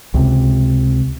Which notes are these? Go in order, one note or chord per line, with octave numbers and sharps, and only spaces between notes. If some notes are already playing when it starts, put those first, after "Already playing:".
C#2 C3